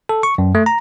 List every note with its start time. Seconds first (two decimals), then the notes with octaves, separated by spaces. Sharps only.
0.09 A4
0.23 C#6
0.38 F#2
0.55 A3
0.66 A#5